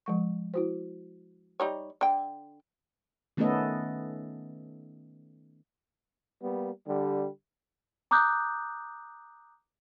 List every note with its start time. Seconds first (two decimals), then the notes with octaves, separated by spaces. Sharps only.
0.06 F3 G#3 C#6
0.54 E4 F#4 C5
1.60 G3 D#4 C#5
2.01 D3 G5
3.37 D#3 A3 B3 C#4 A4 D#5
6.42 G3 A#3 B3
6.86 D3 G3
8.11 A#5 D6 D#6 F#6 G6